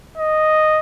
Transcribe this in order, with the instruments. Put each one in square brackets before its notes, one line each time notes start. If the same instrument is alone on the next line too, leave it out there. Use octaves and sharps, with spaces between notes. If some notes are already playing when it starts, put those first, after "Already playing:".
[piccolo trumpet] D#5